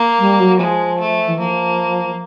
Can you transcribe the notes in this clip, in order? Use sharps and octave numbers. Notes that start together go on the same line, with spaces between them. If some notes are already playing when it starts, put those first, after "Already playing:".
Already playing: A#3
G3
F#3
F3 G#3
A3
E3
F3 A#3